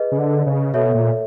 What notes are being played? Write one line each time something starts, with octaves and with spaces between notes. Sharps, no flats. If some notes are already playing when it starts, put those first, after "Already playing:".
Already playing: G#4 B4 D#5
C#3
D3
C#3
B2 A4 C#5 E5
A#2